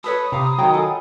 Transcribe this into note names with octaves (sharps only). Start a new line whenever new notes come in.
A4 B4 C#5 B5 D#6
C3 F5 A#5
D#3 F#3 F5 G5 A#5
F4 A4 G#5